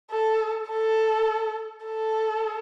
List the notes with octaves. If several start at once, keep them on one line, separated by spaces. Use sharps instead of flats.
A4
A4
A4